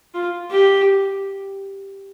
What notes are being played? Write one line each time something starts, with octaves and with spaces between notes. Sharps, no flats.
F4
G4